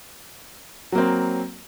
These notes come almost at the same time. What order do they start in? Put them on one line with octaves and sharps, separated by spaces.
F#3 A#3 C4